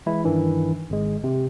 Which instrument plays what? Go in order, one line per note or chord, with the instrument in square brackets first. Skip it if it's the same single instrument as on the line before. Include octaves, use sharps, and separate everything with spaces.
[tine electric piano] E3 G#3 E4
G2 D#3 E3 D4
G#1 G#3
C3